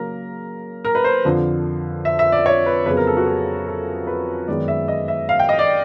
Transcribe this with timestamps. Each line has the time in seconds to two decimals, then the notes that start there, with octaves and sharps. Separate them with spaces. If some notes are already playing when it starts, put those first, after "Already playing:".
Already playing: C#3 F#3 A#3 A#4
0.85 A#4
0.95 B4
1.04 C5
1.25 F2 D3 F3
2.05 E5
2.19 E5
2.32 D5
2.46 C#5
2.66 B4
2.86 F2 C#3 F#3 B3 B4
2.97 A#4
3.07 A4
3.17 F#4
3.27 G#4
3.67 A4
4.07 B4
4.48 F#2 D#3 G#3 B3 D5
4.68 E5
4.88 D#5
5.08 E5
5.29 F5
5.39 G5
5.49 D#5
5.59 D5